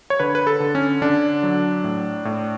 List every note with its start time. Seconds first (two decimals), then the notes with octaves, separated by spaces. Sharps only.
0.10 C#5
0.20 D3 B4
0.35 B4
0.47 A4
0.60 D3
0.75 C#4
1.02 D3 D4
1.43 F#3
1.84 A2
2.25 A2